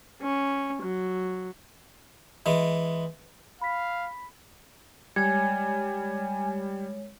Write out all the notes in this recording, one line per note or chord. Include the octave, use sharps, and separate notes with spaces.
C#4
F#3
E3 G#3
F5 B5 B6
G3 G#3 C#5 G#5 G#6